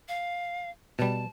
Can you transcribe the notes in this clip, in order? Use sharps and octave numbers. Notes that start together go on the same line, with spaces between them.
F5
B2 G3 A5